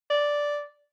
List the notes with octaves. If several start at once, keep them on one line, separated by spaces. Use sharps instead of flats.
D5